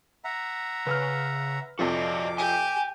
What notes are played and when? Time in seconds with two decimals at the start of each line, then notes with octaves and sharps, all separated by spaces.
0.24 E5 F#5 A#5
0.87 C#3 B4 E6 F6
1.79 F2 C3 F3 F#4 D5 D#5 D6
2.38 G4 G#5